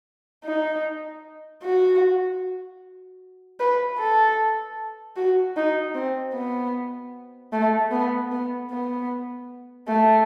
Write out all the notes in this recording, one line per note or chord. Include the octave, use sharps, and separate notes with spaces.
D#4
F#4
B4
A4
F#4
D#4
C4
B3
A3
B3
B3
B3
A3